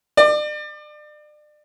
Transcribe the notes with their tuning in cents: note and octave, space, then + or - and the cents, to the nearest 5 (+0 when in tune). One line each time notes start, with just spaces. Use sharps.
D5 +35 D6 +0